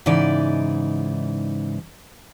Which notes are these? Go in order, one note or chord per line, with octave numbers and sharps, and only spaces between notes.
G#2 C#3 E3 D#4 D5